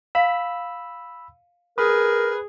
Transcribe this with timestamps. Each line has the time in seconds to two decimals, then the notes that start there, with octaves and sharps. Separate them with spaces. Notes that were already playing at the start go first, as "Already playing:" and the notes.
0.15 F5 B5 E6
1.78 G#4 A#4 B4 D#6